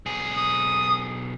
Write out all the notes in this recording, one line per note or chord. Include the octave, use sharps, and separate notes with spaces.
B1 G#4
D#6